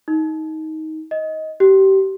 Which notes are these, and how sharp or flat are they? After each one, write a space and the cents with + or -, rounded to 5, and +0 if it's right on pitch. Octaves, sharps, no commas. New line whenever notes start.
D#4 +20
D#5 +15
G4 -30